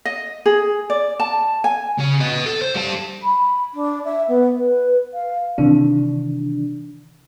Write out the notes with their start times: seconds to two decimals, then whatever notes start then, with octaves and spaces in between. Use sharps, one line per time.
0.05 D#5
0.46 G#4
0.90 D5
1.20 A5
1.64 G#5
1.98 C#3 C#4
2.20 B4 D#5
2.46 A4
2.62 C5
2.75 G3 A5
3.23 B5
3.74 D4
4.05 E5
4.28 B3
4.57 B4
5.13 F5
5.58 C3 D#3 E3 D4